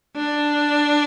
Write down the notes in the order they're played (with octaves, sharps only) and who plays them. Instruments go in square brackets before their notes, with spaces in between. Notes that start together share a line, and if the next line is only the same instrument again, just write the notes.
[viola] D4